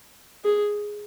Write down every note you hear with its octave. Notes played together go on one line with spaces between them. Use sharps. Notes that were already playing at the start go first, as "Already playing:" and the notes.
G#4